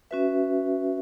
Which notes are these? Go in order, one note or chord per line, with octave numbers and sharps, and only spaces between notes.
C#4 F#4 B4 E5